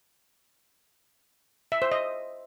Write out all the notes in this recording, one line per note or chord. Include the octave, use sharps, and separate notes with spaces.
E5
C5
D#5